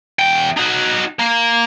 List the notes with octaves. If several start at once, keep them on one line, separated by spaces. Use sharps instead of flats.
E2 G5
D#4 F#4
A#3